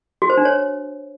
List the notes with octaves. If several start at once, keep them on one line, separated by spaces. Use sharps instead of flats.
F#4
C5
D4
C#5